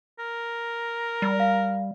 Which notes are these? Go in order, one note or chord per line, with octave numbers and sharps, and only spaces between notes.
A#4
G3
F5